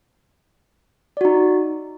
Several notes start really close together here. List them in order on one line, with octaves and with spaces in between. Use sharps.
D5 F#4 D#4